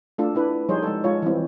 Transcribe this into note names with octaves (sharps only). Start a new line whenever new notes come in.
A3 D4 F4 A4
D4 E4 B4
F3 G3 D#4 G#4 C5 C#5
G#3 A4
G#3 F4 C#5
E3 G3 C4